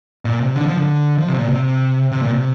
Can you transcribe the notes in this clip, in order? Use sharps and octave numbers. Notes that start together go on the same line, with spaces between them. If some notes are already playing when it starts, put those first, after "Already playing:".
A#2
C3
D3
F3
D3
F3
C3
A#2
C3
C3
A#2
C3